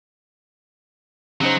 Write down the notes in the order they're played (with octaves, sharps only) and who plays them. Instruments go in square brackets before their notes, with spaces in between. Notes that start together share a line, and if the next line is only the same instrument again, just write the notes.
[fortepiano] C#3 D#4 C5 [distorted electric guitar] F#3